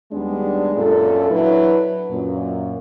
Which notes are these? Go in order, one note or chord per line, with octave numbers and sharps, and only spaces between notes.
D#2 G3 G#3 B3 D4
F#2 A#2 A4
F#3 D4 E4 F#4 B4
F#2 A#2